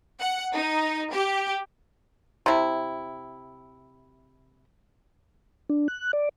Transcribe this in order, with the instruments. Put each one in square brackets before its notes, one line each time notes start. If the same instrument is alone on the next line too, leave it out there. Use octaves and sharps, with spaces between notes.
[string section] F#5
D#4
G4
[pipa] C3 E4
[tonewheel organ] D4
F#6
D5